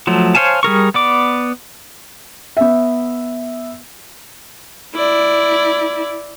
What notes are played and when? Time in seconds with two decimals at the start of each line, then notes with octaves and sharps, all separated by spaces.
0.07 F3 F#3 A3
0.35 C5 C#5 F5 G#5 A5
0.63 G3 G#4 A#4 C#6
0.94 B3 D5 D6
2.57 B3 E5
4.95 E4 D5